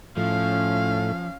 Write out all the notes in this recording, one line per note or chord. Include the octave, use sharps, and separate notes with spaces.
A2 F3 C#4 F5